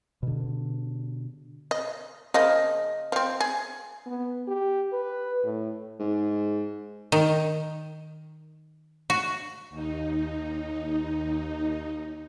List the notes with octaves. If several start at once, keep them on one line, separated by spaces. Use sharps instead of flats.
B2 D3
D#5
C#3 F3 A#3 D#5
F3 C4
G#4
B3
G4
B4
A2
G#2
D#3
F#4
D#2 D#4